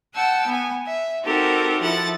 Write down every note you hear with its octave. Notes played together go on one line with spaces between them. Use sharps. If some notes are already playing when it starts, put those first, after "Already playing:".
F#5 G5 A5 E6
B3 G#5
E5
C4 D#4 F#4 G4 A4 A#4
F3 E4 A4 F#5 A6